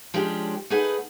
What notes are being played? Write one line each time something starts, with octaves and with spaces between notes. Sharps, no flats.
F3 G#3 C#4 D4 G4
A3 D#4 G#4 B4 F#5